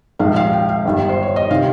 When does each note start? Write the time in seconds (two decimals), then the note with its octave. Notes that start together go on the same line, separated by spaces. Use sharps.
0.19 A#1 G#2 D#3 F5
0.36 F5
0.53 G5
0.69 F5
0.85 G1 G2 D#3
1.09 C5
1.22 C#5
1.36 D#5
1.50 C3 D#3 F5